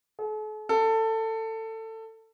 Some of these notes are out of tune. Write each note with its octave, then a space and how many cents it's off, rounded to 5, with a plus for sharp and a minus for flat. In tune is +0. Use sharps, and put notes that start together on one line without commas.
A4 -45
A4 +20